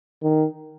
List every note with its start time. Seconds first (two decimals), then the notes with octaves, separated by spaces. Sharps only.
0.23 D#3